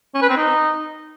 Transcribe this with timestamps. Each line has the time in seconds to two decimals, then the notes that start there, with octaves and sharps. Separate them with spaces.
0.15 C#4
0.22 B4
0.29 C4
0.37 D#4